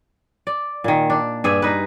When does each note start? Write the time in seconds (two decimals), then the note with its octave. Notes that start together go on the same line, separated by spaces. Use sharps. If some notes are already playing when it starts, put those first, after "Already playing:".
0.47 D5
0.84 A#2 D#3
1.10 D4
1.44 G2 G#4 D5 E5
1.62 D#4 B4